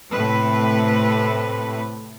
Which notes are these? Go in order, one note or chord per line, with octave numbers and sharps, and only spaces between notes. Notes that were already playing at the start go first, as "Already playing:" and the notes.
A2 C3 A3 B4